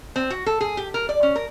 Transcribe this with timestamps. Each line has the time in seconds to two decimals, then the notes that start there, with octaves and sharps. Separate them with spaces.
0.16 C4
0.30 F#4
0.46 A4
0.61 G#4
0.77 G4
0.94 A#4
1.09 D5
1.23 C#4
1.36 A#4